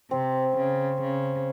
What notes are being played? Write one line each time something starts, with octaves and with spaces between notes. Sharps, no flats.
C3 C4
C#3
C#3